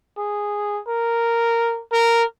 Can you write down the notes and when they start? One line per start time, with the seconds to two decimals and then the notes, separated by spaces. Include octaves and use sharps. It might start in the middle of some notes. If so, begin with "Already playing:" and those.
0.18 G#4
0.88 A#4
1.93 A#4